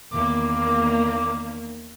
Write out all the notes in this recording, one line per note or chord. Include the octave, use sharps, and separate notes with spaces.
E2 D#3 A#3 D6